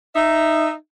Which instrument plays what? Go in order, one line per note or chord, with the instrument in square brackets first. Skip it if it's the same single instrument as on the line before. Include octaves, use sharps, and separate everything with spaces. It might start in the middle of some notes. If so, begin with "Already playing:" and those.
[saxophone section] D#4 E5